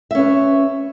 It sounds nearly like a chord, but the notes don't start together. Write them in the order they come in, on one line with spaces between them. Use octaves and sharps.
E5 C#4 B4